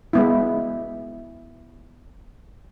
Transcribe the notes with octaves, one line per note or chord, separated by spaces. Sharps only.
G#3 B3 E4